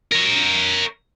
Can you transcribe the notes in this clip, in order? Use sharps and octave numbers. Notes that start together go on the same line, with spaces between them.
A#4 C#5